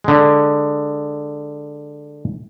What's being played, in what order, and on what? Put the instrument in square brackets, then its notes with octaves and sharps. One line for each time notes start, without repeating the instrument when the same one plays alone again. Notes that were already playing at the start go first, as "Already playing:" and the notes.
[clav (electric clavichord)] D3 G#3